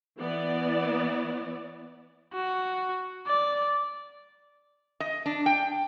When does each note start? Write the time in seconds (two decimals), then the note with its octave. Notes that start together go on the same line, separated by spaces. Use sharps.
0.20 E3 B3 D5
2.33 F#4
3.27 D5
5.00 D#5
5.26 D4
5.46 G5